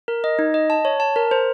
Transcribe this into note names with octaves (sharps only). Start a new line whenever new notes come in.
A#4
D#5
D#4
D#5
A5
C#5
A5
A#4
C5